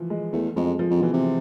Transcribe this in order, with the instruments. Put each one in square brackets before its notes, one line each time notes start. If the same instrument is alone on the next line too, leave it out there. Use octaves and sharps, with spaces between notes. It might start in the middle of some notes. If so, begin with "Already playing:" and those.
Already playing: [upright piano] E3 F3
G#3
[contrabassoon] E2 [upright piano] A3
[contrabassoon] F2 [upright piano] G#3
[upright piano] F3
[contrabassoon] F2
[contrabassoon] B2 [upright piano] E3
[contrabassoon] C3